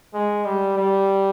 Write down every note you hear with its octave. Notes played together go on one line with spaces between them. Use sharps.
G#3
G3
G3